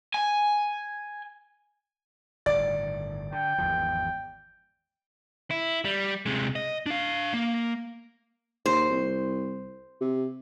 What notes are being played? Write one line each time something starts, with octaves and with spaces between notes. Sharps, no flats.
G#5
G1 A2 D#3 D5 A6
D3 G5
G#1 E2 F3
E4
G3
C3 G#3
D#5
D4 F5
A#3
D#2 C5
C2
C3